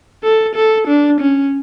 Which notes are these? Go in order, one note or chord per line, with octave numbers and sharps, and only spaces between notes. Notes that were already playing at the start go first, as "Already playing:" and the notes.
A4
A4
D4
C#4